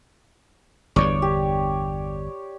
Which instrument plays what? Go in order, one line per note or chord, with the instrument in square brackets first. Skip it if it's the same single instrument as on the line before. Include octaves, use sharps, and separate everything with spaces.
[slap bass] G1 E2 G2 [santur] C#5 D5
[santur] G4